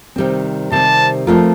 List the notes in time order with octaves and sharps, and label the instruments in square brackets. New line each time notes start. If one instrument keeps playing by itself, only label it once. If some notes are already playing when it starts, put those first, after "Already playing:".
[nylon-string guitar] C3 D#3 G3 C4
[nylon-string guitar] C3 D#3 G3 C4 [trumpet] A5
[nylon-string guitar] F3 A3 C4 F4 A#4